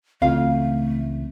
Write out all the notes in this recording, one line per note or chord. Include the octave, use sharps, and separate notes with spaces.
C#2 C#3 E3 A3 C4 F4 F5